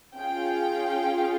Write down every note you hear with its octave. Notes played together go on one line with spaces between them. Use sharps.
C#4 F4 G#4 G5